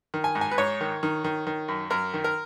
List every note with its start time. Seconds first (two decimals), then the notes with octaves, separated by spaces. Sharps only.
0.14 D#3
0.24 G#5
0.35 G#2
0.41 G#5
0.51 B4
0.58 G#2 C#5
0.81 D#3
1.03 D#3
1.24 D#3
1.47 D#3
1.68 F#2
1.90 F#2 A#4
2.14 D#3
2.24 A#4